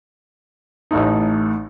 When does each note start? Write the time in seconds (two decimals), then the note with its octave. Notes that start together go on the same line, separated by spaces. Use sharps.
0.91 A1 A2 A3 D#4